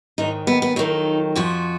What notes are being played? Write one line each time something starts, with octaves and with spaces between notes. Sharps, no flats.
G#2 D#3 F#3 D#4
B3
B3
F2 D#3 F#3 D#4
F2 F3 F#4